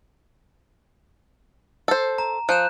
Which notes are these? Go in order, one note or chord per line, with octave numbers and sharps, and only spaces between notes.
A4 C5
A#5
F3 F#6 G6 E7